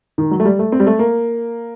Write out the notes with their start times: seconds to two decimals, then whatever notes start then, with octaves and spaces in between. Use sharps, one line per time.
0.18 D#3
0.31 F#3
0.40 A3
0.45 G3
0.59 A3
0.72 C4
0.80 G3
0.87 A3
0.99 A#3